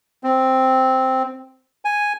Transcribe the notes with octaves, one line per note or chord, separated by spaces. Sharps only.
C4
G#5